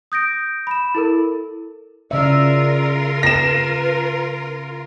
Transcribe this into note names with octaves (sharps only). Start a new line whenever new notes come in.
D#6 G6 A#6 D7
B5 E7
E4 A4 A#4
C#3 F4 A#4 D5 E5
B4 A#6 E7